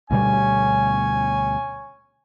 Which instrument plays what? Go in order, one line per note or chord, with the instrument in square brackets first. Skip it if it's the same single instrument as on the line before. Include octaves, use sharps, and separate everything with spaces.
[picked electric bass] D2 B2 G3 [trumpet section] C#4 C#5 G#5